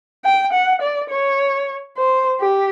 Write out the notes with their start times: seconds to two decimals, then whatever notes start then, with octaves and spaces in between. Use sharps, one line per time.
0.25 G5
0.53 F#5
0.82 D5
1.11 C#5
1.97 C5
2.41 G4